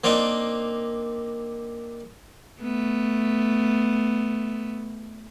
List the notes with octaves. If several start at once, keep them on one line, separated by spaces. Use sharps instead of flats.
A#3 C4 D4 D#4
A3 B3